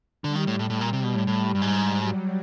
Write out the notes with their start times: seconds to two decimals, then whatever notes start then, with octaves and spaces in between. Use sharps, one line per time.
0.24 D3 G3
0.36 D#3
0.47 A2
0.59 A2
0.70 A2
0.81 A#2
0.93 C3
1.04 B2
1.15 A2
1.27 A2 G3
1.55 G2
1.62 G#2 G3
1.96 F#3